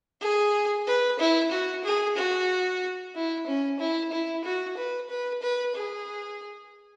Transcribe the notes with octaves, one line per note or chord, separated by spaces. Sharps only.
G#4
B4
E4
F#4
G#4
F#4
E4
C#4
E4
E4
F#4
B4
B4
B4
G#4